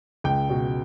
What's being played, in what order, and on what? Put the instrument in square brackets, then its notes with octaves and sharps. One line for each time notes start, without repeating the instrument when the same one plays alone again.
[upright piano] C#2 G5
B2